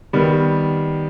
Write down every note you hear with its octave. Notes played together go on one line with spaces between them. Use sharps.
D#3 G3 B3